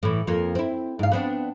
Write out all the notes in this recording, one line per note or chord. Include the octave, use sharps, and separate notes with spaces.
A2 E3
F2 A#3
C4 E4
G#2 F5
B3 C4 D4